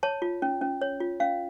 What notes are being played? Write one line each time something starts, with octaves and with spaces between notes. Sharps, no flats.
C#5 A5
F4
C#4
C#4
C#5
F4
C#4 F5